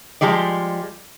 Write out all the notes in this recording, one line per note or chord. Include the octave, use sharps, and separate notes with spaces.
F3 G3 G#3 D5